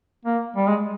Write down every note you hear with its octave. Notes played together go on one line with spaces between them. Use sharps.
A#3
G3
G#3